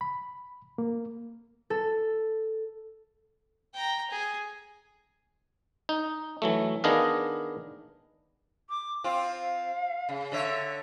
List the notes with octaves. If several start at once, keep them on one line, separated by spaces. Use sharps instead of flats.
B5
A#3
A4
G5 A#5
G#4
D#4
E3 F#3 A3
D#3 B3 D4 G#4 D#5 F5
D6
C4 F4 F5
C#3
D3 C#5 E5